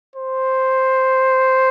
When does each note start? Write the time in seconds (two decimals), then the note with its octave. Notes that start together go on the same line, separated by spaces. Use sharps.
0.16 C5